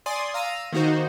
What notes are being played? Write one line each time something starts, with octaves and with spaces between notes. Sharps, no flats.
D5 G#5 C6 D#6
F5 A#5 E6 D#7
D#3 A#3 D#4 F#4 C5